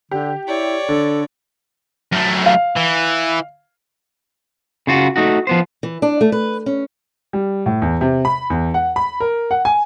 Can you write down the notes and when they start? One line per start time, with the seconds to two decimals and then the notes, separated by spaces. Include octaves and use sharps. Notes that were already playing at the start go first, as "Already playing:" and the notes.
0.11 D3 G4
0.47 E4 C#5 D5
0.89 D3 A4
2.12 F#2 A3
2.46 F5
2.77 E3
4.87 C#3 F4 F#4
5.16 A3 D#4 F#4
5.47 F3 B3 C5
5.83 E3
6.02 D4
6.21 A3
6.32 B4
6.66 C#4
7.33 G3
7.66 A2
7.82 E2
8.01 C3
8.25 B5
8.50 E2
8.74 F#5
8.96 B5
9.20 A#4
9.51 F#5
9.65 G#5